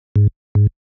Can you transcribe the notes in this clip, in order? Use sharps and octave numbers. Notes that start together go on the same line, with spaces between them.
G#2
G#2